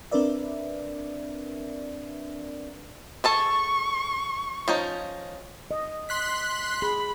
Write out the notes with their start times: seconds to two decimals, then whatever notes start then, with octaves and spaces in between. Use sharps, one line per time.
0.11 C4 D4 A#4 B4 D5 E5
3.24 G#4 A4 A5 C#6
4.68 F3 C#4 D#4
5.71 D#5
6.09 C6 F#6 B6
6.82 G#4 B5